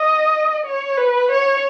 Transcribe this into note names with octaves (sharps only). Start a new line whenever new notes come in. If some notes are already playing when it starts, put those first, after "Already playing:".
Already playing: D#5
C#5
B4
C#5